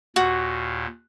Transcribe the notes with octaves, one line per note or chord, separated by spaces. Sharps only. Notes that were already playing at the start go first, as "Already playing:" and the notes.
D#2 A#2 F#4